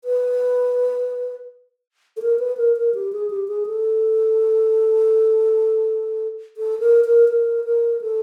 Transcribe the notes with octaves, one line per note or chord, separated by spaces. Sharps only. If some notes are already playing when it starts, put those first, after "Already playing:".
B4
A4
A#4
B4
A#4
A#4
G4
G#4
G4
G#4
A4
A4
A#4
A#4
A#4
A#4
A4